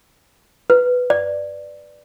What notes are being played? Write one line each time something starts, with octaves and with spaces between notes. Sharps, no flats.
B4
D5